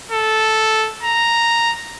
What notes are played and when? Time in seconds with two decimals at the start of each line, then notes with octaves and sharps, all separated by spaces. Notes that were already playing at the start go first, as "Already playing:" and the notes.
0.11 A4
1.03 A#5